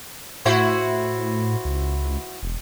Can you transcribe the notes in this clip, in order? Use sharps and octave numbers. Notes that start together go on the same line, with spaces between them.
A2 E4 F#4 C5
C#2
E1